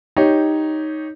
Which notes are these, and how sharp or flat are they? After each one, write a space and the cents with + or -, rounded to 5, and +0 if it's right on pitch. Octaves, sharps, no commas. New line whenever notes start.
D#4 +0 G4 +0 C#5 +0